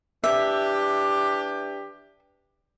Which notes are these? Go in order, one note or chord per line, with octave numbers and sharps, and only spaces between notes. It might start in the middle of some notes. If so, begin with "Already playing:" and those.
E3 D4 G4 E5